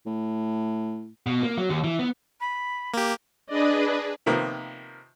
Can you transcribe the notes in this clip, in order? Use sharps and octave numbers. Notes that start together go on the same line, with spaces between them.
A2
B2
A#3
F#3
D#2
E3
B3
B5
A#3 G4
D4 G#4 B4 D5 D#5
C3 D#3 F3 A#3 B3